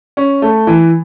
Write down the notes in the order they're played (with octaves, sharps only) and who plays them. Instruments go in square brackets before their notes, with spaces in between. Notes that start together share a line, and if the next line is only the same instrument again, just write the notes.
[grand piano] C#4
A3
E3